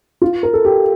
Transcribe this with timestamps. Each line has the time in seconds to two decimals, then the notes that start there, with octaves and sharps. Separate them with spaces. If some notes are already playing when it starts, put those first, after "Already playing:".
0.22 F4
0.43 A#4
0.53 A4
0.65 G4